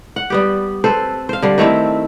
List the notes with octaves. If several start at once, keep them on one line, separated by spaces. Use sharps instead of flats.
F#5
G3 B3 G4
C4 A4 B4 C5
C5 F5
D3 G3
D#3 A3 C4 E4